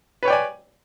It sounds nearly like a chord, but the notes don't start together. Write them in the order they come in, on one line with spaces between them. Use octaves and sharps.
B4 C#5 G5 D5 G#5